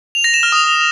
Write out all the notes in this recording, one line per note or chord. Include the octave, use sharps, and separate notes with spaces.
F7
A#6
E7
F6
D#6